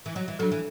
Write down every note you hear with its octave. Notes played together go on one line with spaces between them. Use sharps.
E3
F#3 G3
E3
F#3 D4 A4
E3